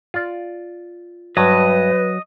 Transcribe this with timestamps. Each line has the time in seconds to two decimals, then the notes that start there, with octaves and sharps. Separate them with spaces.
0.14 F4 D5
1.37 G2 F#3 B4 D#5